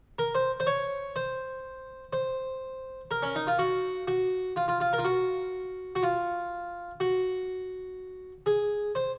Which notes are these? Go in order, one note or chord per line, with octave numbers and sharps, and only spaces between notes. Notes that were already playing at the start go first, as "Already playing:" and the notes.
A#4
C5
C5
C#5
C5
C5
A#4
C#4
D#4
F4
F#4
F#4
F4
F4
F4
A#4
F4
F#4
F#4
F4
F#4
G#4
C5